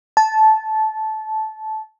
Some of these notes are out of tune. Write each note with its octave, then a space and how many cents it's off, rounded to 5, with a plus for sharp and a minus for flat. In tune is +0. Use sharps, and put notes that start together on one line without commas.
A5 -15